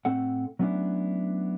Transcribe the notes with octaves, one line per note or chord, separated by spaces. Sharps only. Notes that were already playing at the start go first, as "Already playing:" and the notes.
A2 C4 A4 F#5
F#3 A3 B3 C#4 D4 E4